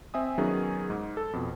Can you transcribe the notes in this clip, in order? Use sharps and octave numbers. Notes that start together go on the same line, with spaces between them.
C4 E5 G#5 D#6
D#3 F#3 B3 C#4 D#4 G#4
G#2
A4
F2 B2